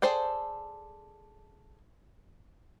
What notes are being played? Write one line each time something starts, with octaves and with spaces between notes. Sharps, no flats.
G#4 A4 C5 D5 G5